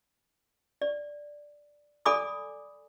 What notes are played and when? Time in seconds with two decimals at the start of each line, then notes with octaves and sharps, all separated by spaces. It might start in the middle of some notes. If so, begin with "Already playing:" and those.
0.82 D5
2.05 A4 D5 G#5 B5 D6 D#6